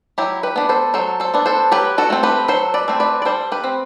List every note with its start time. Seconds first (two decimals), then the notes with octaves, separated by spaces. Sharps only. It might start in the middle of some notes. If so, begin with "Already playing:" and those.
0.18 F#3 E4 G4
0.43 G4 B4
0.56 B3 D4
0.69 A4 C5
0.94 F#3 A4 C5
1.20 A4 C5
1.34 B3 D4
1.46 A4 C5
1.72 F#3 G4 B4
1.98 F#4 A4
2.10 A3 C4
2.23 G4 B4
2.48 F#3 A4 C5
2.74 B4 D5
2.88 A3 C4
3.00 B4 D5
3.22 D5
3.25 G3 A4 C5
3.52 G4 B4
3.64 C4